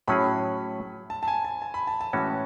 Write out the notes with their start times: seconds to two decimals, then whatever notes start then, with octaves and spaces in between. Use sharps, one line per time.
0.08 A2 F#3 C#4 G#4 B5
1.10 A5
1.23 A5
1.28 G#5
1.45 A5
1.62 A5
1.74 B5
1.87 A5
2.01 A5
2.13 A2 E3 G#3 C#4 F#4